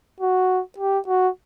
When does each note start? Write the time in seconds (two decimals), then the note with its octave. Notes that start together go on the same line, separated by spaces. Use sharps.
0.20 F#4
0.78 G4
1.08 F#4